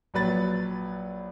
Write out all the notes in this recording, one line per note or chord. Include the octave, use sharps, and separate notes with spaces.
A#1 F#3 B4 A6